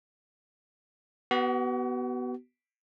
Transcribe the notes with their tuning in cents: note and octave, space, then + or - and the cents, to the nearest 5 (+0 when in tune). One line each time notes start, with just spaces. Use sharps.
B3 +0 F#4 +40